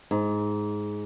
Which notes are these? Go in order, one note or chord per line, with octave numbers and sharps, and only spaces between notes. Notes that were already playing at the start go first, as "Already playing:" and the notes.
G#2